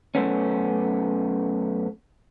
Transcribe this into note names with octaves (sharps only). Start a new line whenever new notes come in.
F#2 A3 B3 C#4